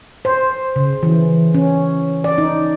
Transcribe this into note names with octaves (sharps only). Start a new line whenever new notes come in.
C5
C#3
E3
C#4
D5
D#4